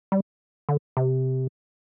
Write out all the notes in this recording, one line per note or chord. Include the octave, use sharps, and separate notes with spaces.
G3
D3
C3